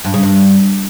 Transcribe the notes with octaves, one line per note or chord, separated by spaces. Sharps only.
G2
C#3
G2